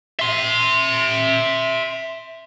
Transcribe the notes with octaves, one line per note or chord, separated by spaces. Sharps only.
E5 C6